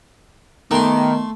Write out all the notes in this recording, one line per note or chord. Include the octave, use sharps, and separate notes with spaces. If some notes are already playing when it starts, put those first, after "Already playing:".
D#3 A3 B3 G4 A#4 B4 C6